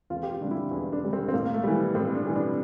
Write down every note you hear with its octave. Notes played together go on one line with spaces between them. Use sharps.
E2 F4
G4
F4
D3 G3 D4
E4
E2
D4
D3 G3
C4
C4
A2 A#3
A#3
A3
E3 G3
A2 C4
D4
E3 G3
D4